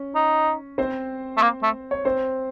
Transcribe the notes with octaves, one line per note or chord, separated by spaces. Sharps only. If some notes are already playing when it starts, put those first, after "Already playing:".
Already playing: C#4
D#4
C4 C5
A3
A#3
A3
C#5
C4 C5